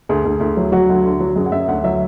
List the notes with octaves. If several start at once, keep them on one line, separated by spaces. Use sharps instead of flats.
D2 G#4
D2
D2
F#3
F#3 F#4
D2
D3
F#3
F#2 G#4
F#5
F#2 E5
D2 F#5
F#3 E5